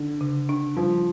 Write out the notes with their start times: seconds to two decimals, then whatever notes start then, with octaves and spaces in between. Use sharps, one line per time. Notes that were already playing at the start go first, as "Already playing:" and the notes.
Already playing: D3
0.21 C#3
0.49 D4
0.77 F3 G3